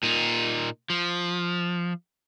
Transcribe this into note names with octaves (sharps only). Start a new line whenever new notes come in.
A#2 D#4
F3